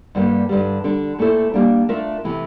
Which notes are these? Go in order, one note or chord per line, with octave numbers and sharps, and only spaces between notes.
G2 D3 G3 A#3
G2 D3 G3
D3 G3 D4
A#2 A3 E4 A4 C5
G3 A#3 D4
A3 D4 F4 A#4 E5
C3 E3 A3